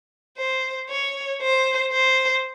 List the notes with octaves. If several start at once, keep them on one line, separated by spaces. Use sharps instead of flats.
C5
C#5
C5
C5